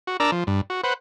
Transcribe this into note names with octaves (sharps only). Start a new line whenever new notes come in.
F#4
D4 A#4 D5 A#5 E6
F3
G2
F#4
B4 C5 F#5